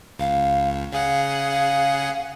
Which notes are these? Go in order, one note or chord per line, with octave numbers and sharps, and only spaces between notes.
C#2 F5
C#3 G#4 F5 F#5
F5